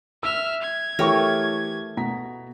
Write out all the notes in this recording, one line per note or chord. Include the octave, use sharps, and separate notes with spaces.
E5 E6 F6
G#6
E3 A3 G4 A#4 C#5 C#6
B2 A#5 B6